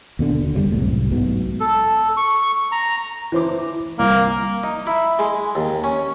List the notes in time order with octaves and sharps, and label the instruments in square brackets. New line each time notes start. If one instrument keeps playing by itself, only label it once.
[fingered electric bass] D#2 B2 D3
F1 B2 G3
C2 F#2 A2 C3
B1 G#2 B2
[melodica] A4
C#6
A#5
[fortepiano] E3 C5 D6
[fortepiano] C2 [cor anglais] A#3
[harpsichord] D#4
E4
G#3
D#2
C#4